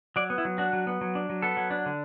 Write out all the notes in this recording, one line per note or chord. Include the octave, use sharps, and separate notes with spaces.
F#3 D5
B3
E4
F#3
D4 F#4
F#3
B3
F#3
D4
F#3
B3 A4
F#3
D4
D3